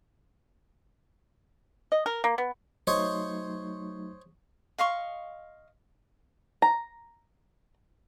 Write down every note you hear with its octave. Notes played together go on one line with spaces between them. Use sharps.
D#5
A#4
A#3
B3
F#3 A3 D#4 C5 C#5 D#5
D#5 F5 C6 C#6
A#5